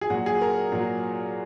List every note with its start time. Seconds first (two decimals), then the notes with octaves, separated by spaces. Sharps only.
0.01 G#4
0.10 A#2 F#3 F#4
0.26 G#4
0.41 A#4
0.72 A#2 F#3